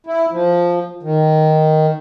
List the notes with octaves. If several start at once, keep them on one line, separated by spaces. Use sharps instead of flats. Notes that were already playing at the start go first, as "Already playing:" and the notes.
E4
F3
D#3